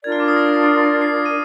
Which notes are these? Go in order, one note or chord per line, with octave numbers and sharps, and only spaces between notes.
D4 F4 A#4 D5 G#6
F6
D6
D#6
A#6
C7
D#7